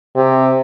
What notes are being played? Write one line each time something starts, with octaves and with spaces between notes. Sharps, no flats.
C3